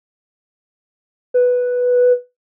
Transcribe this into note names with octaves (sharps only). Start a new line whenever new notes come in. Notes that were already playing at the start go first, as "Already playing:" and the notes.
B4